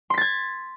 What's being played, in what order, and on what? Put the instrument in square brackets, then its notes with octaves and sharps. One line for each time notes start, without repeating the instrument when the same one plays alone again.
[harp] C6
B6
A6
G#6